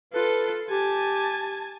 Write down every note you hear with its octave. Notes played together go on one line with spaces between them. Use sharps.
F4 A4 B4
G4 G#5 A5